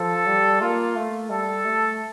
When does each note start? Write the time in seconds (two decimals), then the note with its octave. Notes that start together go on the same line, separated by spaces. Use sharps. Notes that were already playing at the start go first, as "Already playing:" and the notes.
Already playing: F3 A4
0.27 G3
0.61 A#3 F4
0.96 A3
1.30 G3 A4
1.65 A3